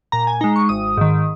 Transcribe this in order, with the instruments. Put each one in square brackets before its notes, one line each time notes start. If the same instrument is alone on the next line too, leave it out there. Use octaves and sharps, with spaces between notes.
[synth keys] A#2 A#5
G#5
G#3 D#4 A#5
C#6
G#1 D#6
G#2 D#3